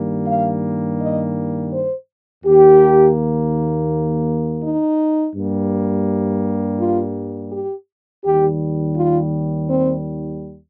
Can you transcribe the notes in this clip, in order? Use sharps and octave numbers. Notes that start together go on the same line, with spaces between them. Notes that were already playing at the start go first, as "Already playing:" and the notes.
Already playing: G2 D#3 G3 A#3
F5
D#5
C5
D#2 D#3 A#3 G4
D#4
G2 G3 A#3
F4
G4
D#2 D#3 G3 G4
F4
C4